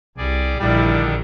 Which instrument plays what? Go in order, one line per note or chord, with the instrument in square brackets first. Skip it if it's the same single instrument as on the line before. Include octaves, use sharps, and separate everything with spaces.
[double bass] C2 [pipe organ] G3 G#4 D5
[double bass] A#1 [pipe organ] D3 D#3 D4 [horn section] G3 E4